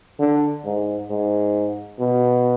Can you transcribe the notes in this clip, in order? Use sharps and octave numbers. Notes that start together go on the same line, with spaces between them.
D3
G#2
G#2
B2